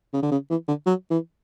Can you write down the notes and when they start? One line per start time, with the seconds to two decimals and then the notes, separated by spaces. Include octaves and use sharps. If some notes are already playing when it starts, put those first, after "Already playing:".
0.13 C#3
0.22 D3
0.31 C#3
0.50 E3
0.68 D3
0.86 F#3
1.10 E3